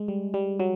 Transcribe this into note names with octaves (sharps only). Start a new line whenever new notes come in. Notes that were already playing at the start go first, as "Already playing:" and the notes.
Already playing: G#3
G3
G3
F#3